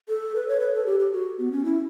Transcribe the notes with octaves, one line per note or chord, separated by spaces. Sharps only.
A4
B4
C#5
B4
A4
G4
G4
F#4
B3
C#4
E4